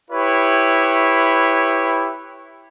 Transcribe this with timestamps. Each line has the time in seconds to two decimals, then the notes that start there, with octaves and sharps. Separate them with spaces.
0.11 E4 G4 B4 C#5